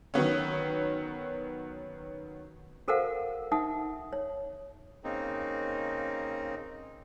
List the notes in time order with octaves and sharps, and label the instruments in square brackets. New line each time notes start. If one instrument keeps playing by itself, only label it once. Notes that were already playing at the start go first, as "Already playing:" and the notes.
[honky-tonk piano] D#3 F#3 B3 C#4
[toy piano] F#4 A4 A#4 C5 F5 F#5
D#4 E5 F#5 D#6
C#5
[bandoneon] C#3 A#3 C4 D#4